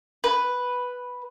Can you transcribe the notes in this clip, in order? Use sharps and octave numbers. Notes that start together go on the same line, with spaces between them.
B4